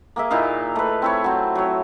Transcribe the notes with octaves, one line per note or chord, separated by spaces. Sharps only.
A#3 G#4 E5
A#2 D#4 E4 F5
A3 B4
C4 E4 C#5
F#3 C4
F#3 C#5